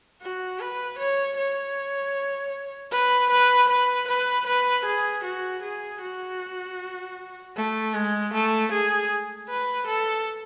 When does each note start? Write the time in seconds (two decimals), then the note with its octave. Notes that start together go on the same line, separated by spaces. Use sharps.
0.22 F#4
0.60 B4
0.98 C#5
1.37 C#5
2.91 B4
3.30 B4
3.69 B4
4.08 B4
4.47 B4
4.85 G#4
5.24 F#4
5.63 G#4
6.01 F#4
7.56 A3
7.94 G#3
8.33 A3
8.72 G#4
9.49 B4
9.88 A4